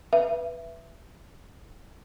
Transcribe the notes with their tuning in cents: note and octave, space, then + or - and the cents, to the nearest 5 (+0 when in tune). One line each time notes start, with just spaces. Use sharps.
B4 +0 E5 +15